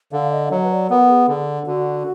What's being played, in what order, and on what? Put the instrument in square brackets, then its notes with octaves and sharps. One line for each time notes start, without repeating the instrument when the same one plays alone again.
[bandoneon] D3 [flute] F5
[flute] D#5
F5
[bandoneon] F#3 [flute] D#5
[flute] B4
D5
[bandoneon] B3 [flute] A#4
[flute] A#4
G#4
[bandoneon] D3 [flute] G#4
[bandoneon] D3 [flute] F#4